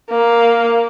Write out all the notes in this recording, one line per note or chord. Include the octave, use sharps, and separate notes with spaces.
A#3